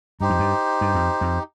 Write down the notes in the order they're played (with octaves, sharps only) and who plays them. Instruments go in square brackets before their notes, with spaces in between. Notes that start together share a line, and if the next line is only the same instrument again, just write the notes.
[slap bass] G2 [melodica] D#4 G4 C5
[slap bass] F2
G2
G2
F2
F2